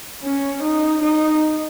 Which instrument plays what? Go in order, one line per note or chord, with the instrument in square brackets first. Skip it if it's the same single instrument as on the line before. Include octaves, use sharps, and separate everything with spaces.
[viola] C#4
D#4
D#4